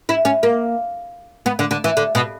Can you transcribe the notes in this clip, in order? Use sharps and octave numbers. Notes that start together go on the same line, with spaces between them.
E4
C#4
A#3
B3
D3
D3
E3
D3
B2